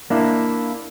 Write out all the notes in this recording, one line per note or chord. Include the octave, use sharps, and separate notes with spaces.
A#3 D4 E4